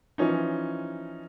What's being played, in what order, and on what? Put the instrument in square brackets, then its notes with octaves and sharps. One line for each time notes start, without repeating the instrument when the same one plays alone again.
[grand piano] E3 F3 C#4 D#4